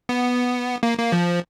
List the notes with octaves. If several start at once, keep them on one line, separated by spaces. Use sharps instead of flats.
B3
A#3
A#3
F3